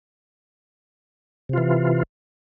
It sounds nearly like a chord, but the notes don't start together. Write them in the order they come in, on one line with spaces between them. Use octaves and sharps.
C3 F4 E3